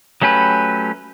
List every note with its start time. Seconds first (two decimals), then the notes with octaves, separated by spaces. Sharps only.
0.22 F#3 A3 C#4 G4 B4